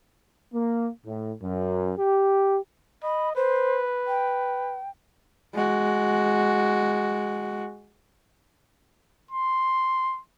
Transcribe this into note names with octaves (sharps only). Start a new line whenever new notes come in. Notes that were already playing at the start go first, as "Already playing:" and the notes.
A#3
A2
F#2
G4
D#5 B5
B4 C5
G5
G#3 F#4
C6